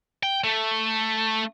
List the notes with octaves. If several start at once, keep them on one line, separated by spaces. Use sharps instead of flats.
G5
A3